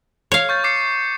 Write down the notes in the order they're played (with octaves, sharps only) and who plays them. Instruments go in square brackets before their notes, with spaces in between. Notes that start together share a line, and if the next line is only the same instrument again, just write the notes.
[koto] C#5 F5
[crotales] C#6 G6 A6
D6 C7 C#7